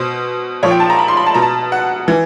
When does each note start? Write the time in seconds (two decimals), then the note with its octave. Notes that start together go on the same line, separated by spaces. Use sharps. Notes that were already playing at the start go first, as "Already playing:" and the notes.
Already playing: B2 C5
0.63 A#2 F3 C#5
0.71 G5
0.80 A5
0.90 A#5
0.99 B5
1.08 C6
1.17 B5
1.26 A5
1.34 B2 A#5
1.42 A5
1.72 F#5
2.08 E3